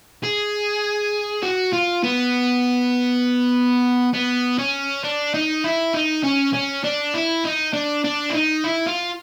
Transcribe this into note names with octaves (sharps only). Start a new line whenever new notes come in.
G#4
F#4
F4
B3
B3
C#4
D4
D#4
E4
D#4
C#4
C#4
D4
E4
D#4
D4
D4
E4
D#4
E4
F4